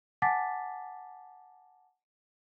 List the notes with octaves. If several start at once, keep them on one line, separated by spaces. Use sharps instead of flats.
F#5 G#5 A5 D6 A6 B6